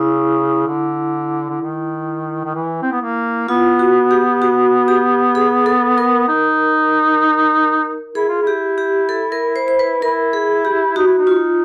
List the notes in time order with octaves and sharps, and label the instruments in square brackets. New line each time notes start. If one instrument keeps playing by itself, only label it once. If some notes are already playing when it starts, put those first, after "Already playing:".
Already playing: [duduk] C#3 [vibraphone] E4
[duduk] D3
D3
D#3
D#3
E3
C4
B3
A#3
[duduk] B3 [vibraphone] F4
[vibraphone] F#4
G4
F#4
G4
G#4
A4
A#4
[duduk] D#4
[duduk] E4 [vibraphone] G#4
[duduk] F4
[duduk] E4 [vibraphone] G4
[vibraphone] G4
A4
A#4
C5
C5
B4
[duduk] E4 [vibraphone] A#4
[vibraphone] G#4
G4
[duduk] D#4 [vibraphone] F#4
[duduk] E4
D#4
[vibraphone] F4